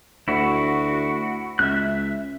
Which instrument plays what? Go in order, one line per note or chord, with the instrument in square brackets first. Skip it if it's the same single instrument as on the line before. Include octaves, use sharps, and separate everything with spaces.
[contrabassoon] D2 [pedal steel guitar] E4 F#4
[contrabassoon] C#2 [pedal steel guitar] E5 F#6